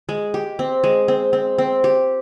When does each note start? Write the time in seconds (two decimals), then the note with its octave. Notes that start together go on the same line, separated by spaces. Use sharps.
0.09 G#3
0.34 G4
0.59 C4
0.84 G#3
1.08 C4
1.33 C4
1.58 C4
1.84 G4